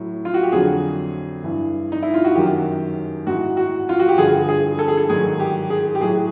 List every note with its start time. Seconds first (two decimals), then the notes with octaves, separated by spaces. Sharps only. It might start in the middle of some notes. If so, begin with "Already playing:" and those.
Already playing: A2 F#3
0.25 F4
0.34 F#4
0.43 G4
0.52 F2 D3 F#3 G#4
1.44 G2 E3
1.92 D#4
2.03 E4
2.14 F4
2.25 F#4
2.35 F#2 D#3 F#3 G4
3.27 G#2 E3 F#4
3.57 F#4
3.89 F4
4.00 F#4
4.08 G4
4.18 G2 D3 F3 G#4
4.49 G#4
4.79 A4
4.88 G#4
4.97 A4
5.09 G#2 D#3 F#3 G#4
5.40 G4
5.70 G#4
5.95 G4
6.01 A2 F#3 G#4